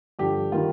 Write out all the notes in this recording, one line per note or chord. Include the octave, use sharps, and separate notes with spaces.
G2 D3 F3 G4
D#3 G3 A#3 F4